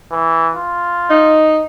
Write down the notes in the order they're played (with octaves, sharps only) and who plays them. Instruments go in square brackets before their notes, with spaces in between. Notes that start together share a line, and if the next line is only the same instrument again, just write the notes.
[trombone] E3
F4
[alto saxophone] D#4